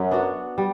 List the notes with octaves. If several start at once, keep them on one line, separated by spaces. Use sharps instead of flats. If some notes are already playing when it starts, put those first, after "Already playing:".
Already playing: F#2
B3 D4 F#4
G3